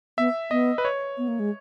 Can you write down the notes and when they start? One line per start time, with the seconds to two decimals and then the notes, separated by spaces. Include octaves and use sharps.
0.18 B3 E5
0.51 B3 D#5
0.78 B4
0.85 C#5
1.18 B3
1.28 A#3
1.40 G#3